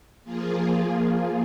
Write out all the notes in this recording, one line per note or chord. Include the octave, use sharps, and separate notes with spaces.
F3 A#3 F4 G#4